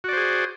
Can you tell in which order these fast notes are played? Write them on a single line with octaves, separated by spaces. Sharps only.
F#4 D5 C5 G#4